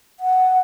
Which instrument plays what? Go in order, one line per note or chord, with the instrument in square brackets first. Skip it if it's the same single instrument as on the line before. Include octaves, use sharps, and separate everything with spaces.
[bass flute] F#5